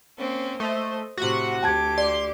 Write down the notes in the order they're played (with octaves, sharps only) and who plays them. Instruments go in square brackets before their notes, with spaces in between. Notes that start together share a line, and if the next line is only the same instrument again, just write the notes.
[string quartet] A#3 C4 C#4
[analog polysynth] A3 [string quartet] C5 D#5
[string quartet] A2 C3 [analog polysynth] F#4 F#5
[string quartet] D2 G4 D6 [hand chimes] G5 A5 G#6
[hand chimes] D5 [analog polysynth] C6